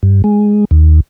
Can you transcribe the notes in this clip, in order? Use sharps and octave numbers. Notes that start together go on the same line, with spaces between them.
G2
G#3
D#2